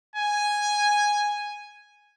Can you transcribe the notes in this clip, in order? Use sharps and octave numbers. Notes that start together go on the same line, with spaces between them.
G#5